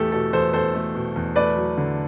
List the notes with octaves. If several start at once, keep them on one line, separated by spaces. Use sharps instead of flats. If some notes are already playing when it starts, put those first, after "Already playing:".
Already playing: E2 A3 G4 A4
B2 A4
E2 A4 C5
E2 A4 C5
A3
B2
E2
A3 B4 D5
F#3
D3